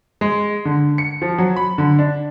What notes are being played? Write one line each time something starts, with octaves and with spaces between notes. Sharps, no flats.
G#3
D3
C#7
F3
F#3
B5
D3
D4